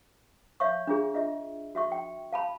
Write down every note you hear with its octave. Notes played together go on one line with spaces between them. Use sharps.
C#5 E5 F5 C#6
D4 F4 G#4
F4 D#5 E5
F#4 E5 C#6
G5
F5 A5 B5